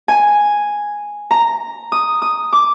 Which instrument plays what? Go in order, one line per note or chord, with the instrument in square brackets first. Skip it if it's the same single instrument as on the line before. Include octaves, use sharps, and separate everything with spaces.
[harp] G#5
A#5
D#6
D#6
D6